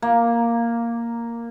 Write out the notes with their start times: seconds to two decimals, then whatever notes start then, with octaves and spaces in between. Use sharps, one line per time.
0.02 A#3